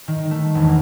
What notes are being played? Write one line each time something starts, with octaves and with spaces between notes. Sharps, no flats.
D#3
A3
E1
A#3